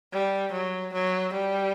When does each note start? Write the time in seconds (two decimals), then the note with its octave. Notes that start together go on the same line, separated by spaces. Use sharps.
0.13 G3
0.53 F#3
0.94 F#3
1.33 G3